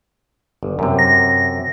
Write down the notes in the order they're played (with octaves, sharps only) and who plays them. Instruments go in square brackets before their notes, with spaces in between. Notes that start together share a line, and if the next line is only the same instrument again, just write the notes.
[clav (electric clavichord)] G1
F#2 C3
[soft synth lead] A#6